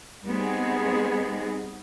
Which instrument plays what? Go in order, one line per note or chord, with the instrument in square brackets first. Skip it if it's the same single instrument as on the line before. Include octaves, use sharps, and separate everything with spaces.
[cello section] G3 G#3 B3 C4 D#4 G#4